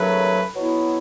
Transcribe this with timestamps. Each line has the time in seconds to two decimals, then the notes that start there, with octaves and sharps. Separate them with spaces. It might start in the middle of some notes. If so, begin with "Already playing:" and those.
Already playing: D#2 C#3 F#3 A3 B4
0.54 B2 F#3 B3 E4